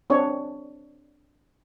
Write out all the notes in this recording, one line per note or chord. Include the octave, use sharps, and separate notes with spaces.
C4 D4 C#5